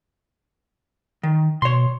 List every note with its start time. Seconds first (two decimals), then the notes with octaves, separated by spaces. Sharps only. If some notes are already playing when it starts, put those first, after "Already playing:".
1.23 D#3
1.62 B2 C#5 C6